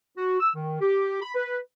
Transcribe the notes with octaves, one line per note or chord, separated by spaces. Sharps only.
F#4
E6
D#3
G4
B5
B4